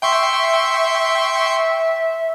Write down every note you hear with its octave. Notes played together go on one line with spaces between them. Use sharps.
E5 G5 C6 C#6